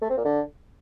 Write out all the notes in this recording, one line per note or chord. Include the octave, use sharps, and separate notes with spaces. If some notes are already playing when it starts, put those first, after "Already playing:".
A3
C4
A#2
D3